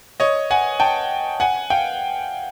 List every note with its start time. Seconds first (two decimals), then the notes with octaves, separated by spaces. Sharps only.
0.20 C#5 D#5
0.51 F#5 G#5
0.80 G5 A5
1.40 F#5 G#5
1.70 F5 G5